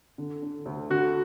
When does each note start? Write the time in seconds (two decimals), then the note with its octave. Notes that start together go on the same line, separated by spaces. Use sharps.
0.18 D3
0.42 D3
0.66 D2
0.90 D3 F#4